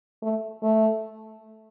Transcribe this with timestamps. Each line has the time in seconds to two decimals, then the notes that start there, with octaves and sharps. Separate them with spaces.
0.22 A3
0.63 A3